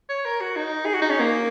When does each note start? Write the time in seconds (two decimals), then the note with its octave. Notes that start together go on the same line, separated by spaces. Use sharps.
0.09 C#5
0.25 A#4
0.41 F#4
0.56 D#4
0.85 G#4
0.94 F#4
1.02 D#4
1.10 C#4
1.19 A#3